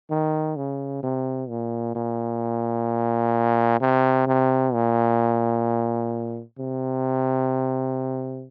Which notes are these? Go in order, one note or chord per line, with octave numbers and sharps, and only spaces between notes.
D#3
C#3
C3
A#2
A#2
C3
C3
A#2
C3